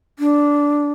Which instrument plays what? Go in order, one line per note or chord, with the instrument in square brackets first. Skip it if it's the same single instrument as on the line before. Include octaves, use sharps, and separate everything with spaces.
[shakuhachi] D4